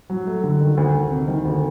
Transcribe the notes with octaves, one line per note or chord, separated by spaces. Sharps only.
F#3
A3
D3
D#3
D2
D2
C3
D#3
D2